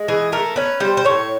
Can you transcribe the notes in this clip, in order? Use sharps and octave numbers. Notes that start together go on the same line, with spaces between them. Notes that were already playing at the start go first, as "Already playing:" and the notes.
Already playing: G#3
E3 G#4
A3 A#4
C#4 B4
G3 C5
C5
A2 C#5